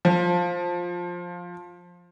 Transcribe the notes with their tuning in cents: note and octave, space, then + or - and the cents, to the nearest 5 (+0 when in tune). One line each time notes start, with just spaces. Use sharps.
F3 +10